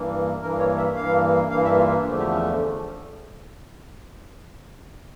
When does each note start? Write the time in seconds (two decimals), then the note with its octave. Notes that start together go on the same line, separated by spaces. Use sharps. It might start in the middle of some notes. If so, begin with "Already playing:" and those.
Already playing: G2 E3 A#3
0.40 G2 E3 A#3 A#4
0.59 C#5
0.77 E5
0.96 G2 E3 A#3 F5
1.50 G2 E3 A#3 F5
1.64 E5
1.78 F4
1.91 D4
2.05 E2 D3 F3 A3
2.19 G4
2.33 C#4
2.46 D4